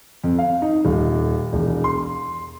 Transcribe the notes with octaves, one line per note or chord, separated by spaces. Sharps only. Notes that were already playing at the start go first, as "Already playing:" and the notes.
F2
F5
D#4
D#1
E1
C6